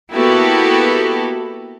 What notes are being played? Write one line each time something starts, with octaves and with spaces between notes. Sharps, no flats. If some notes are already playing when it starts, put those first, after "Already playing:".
A#3 B3 E4 F#4 G4 A4